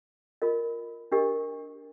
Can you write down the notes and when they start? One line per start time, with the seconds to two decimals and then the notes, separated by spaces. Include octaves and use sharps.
0.42 F4 A#4 D#5
1.12 D4 G4 A#4 D#5